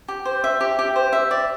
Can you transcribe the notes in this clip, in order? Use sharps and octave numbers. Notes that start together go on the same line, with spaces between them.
G4
C5
E5
G4
G4
C5
E5
D5